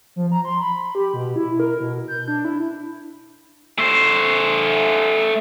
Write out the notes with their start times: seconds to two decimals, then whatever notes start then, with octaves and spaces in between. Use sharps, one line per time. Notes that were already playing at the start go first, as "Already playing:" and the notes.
0.16 F3
0.32 A#5
0.45 C6
0.61 B5
0.95 G4
1.13 B2
1.36 E4
1.60 A#4
1.80 B2
2.08 G6
2.28 D4
2.45 E4
3.78 A3 C5